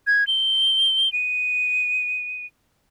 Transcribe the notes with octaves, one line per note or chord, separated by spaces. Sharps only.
G#6
G7
D#7